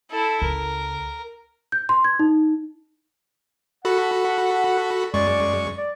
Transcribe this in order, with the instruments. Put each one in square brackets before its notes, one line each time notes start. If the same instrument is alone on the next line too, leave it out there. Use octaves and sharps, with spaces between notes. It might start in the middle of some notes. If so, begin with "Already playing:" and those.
[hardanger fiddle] E4 A4
[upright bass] C#2 [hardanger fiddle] A#4
[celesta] G6
C6
G#6
D#4
[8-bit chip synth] F#4 A4 B5 [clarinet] F#5
[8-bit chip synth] F#2 G#3 C#6 [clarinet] D5
[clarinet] D5